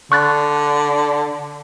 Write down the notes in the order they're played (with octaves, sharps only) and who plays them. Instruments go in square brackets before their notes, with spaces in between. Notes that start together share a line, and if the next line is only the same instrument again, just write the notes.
[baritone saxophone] D3 [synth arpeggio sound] C#6 F#6 A6